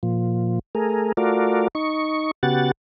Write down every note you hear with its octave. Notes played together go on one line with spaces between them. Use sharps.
A#2 F3
A3 G#4 A#4
A3 F4 F#4 A#4 D5
D#4 C#6
C#3 B3 F#4 G4 F#5 A6